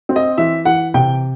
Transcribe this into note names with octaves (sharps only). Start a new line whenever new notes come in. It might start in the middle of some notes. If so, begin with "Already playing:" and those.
C4
D#5
E3 E5
E3 F#5
C3 G5